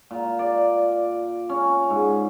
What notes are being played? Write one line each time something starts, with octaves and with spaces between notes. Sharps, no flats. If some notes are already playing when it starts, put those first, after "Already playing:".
A#2
D5
C#4
G#2